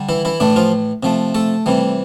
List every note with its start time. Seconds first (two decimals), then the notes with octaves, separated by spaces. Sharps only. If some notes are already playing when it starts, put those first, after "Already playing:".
Already playing: D3 G3
0.09 E3 E4
0.25 E3 E4
0.40 A2 E3 A3 D4
0.56 F3 F4
1.03 C3 F3 A3
1.35 A3 A4
1.66 C3 E3 G3